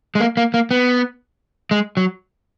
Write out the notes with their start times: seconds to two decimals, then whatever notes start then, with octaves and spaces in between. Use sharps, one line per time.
0.15 G#3
0.20 A#3
0.37 A#3
0.54 A#3
0.71 B3
1.71 G#3
1.97 F#3